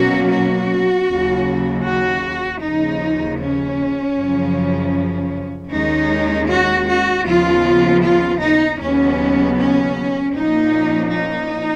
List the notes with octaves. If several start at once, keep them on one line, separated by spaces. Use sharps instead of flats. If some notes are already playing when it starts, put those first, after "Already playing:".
Already playing: B2 F#3 A#3 C#4 F#4
F#4
D#2 C#3 F#3
F#4
D#2 C#3 F3 D#4
C#4
F#2 C#3 F3
D#2 D#3 G#3 C#4 D#4
F#4
F#4
D#2 C#3 F3 B3 F4
F4
D#4
D#2 C#3 F#3 B3 C#4
C#4
A#2 F3 A#3 C#4 D#4
D#4